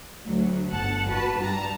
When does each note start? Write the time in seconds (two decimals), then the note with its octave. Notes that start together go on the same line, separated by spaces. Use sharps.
0.25 D2 F#3
0.70 G1 F#5 A5
1.08 F#4 B4 A5
1.38 G2 G3 A5 A#5